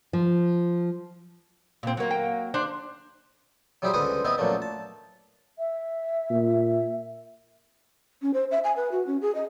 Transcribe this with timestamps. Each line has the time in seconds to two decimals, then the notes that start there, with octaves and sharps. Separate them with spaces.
0.13 F3
1.83 A#2 C4
1.97 F#3 A#3
2.11 G5
2.54 D4 C5
3.82 F#3 G3 E4 G4 G#4 C5
3.94 C#2 D3 B4 C5 G#5 D#6
4.25 B3 C4 E4 C5 D#5
4.38 F#2 A#2 F#3 A3 A#3 D4
4.62 A5
5.59 E5
6.30 A#2
8.22 C#4
8.34 C5
8.51 E5
8.64 G#5
8.76 B4
8.92 F#4
9.07 C#4
9.22 G#4
9.35 D#5